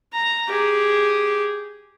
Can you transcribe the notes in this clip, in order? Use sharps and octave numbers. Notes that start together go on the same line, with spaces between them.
A#5
G4 G#4